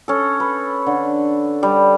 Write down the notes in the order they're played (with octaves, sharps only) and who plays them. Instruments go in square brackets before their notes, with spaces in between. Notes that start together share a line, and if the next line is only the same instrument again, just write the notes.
[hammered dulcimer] C#4 A4
B4
D3
G3